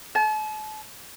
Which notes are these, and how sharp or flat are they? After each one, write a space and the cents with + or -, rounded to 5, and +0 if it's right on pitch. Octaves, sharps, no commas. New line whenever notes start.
A5 -40